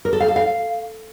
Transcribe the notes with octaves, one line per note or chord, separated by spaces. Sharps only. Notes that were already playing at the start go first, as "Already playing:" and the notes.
A#4
A4
F5
A4
F5